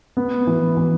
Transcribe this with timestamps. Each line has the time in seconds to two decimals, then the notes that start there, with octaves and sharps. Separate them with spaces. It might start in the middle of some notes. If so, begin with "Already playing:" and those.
0.17 B3
0.47 E3
0.77 E3